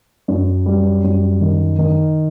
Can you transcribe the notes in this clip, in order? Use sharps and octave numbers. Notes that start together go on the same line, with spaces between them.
F#2
G3
F#2
D#3
D#3